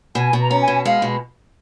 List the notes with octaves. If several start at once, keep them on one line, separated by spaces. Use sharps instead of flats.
B2 G#5
B2
A#5
C#4
G#5
B2
G#3 F5
B2